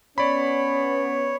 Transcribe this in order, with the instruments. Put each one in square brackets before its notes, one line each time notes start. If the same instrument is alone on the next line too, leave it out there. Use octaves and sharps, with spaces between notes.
[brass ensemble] B3 C#4 [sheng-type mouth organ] C#5 [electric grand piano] D5 B5